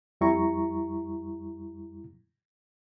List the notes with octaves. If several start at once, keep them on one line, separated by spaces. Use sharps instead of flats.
F2 G3 E4 A#5 C#6